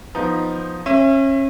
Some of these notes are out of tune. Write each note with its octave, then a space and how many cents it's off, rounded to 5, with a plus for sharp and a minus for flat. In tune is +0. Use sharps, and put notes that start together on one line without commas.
F3 +0 B3 +0 D#4 +0
C#4 -30 E5 +20